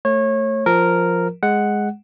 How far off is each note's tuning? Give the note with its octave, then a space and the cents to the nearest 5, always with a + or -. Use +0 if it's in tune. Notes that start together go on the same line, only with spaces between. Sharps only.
A3 +10 C#5 -25
F3 +0 A#4 -5
G#3 +0 F#5 +0